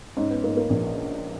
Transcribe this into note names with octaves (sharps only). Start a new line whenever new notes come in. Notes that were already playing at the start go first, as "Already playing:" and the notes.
G#2 C#4
B3
G#2 A#3
A#3
A#1